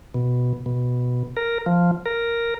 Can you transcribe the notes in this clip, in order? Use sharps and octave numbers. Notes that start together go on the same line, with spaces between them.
B2
B2
A#4
F3
A#4